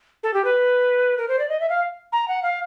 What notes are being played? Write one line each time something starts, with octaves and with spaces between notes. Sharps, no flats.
A4
G4
B4
A#4
C5
D5
D#5
E5
F5
A#5
F#5
F5